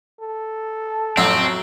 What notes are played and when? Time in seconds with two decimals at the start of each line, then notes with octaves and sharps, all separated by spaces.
0.21 A4
1.17 A1 F2 A2 F#3 C4 F#4 E5